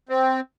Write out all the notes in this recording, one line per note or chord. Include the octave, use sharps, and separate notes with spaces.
C4